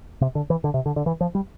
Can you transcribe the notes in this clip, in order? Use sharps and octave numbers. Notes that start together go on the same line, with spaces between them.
C3
D3
E3
D3
C3
D3
D3
E3
F3
G3